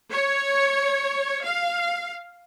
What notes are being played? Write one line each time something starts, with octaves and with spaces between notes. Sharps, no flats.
C#5
F5